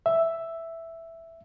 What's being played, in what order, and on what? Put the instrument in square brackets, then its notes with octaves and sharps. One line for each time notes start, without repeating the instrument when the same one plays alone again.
[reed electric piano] E5